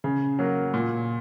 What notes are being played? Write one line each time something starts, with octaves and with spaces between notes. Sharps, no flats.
C#3
F#3 A#3
A#2